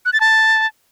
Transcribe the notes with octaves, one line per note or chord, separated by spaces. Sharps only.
F#6
A6
A5